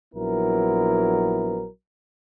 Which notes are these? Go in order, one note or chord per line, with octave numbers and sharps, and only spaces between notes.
A#1 F#3 B3 E4 A#4